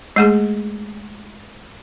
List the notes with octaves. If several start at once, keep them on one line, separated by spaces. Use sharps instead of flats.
G#3 A3 G#4